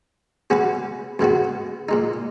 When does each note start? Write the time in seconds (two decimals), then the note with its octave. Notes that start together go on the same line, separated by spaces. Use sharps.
0.50 B2 G#3 C#4 F#4 B4
1.19 F#2 C#3 G#3 B3 F#4
1.89 A#2 G#3 D#4